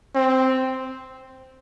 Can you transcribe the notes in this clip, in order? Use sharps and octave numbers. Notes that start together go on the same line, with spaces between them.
C4